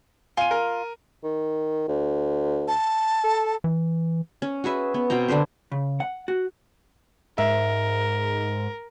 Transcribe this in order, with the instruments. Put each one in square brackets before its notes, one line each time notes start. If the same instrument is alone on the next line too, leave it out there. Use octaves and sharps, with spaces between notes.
[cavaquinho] F4 [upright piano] G#5 D#7
[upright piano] A#4
[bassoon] D#3
D2
[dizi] A5
[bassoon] A4
[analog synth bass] E3
[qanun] C#4
F#4 G#4 B4 E5
B3
B2 C4 G5 A#5
D3 D4 B4 C5
[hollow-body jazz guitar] C#3
F#5
F#4
[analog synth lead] G#2 [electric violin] A#4 [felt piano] E5